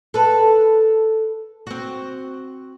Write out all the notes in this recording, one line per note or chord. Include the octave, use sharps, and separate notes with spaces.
A4 B4
C4 F#4